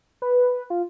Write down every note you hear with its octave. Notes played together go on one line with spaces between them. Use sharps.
B4
F4